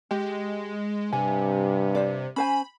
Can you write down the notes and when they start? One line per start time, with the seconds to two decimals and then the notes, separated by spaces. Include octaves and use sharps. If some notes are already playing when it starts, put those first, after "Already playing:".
0.11 G#3 G4
1.12 G2 C3 G#5
1.95 C5 D5
2.36 C#4 C5 G#5 B5